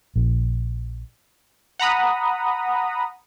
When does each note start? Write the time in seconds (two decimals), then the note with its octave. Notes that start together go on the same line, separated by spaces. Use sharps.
0.16 A#1
1.79 F#5 A#5 B5 D#6